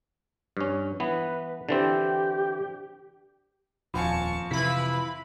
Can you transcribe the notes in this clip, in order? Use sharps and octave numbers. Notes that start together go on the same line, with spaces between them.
G2 C#4
E3 B3 B4
D3 E3 C4 G4
D#1 F2 F5 G#5 A5 C#6
C3 E3 E4 F4 B4 B5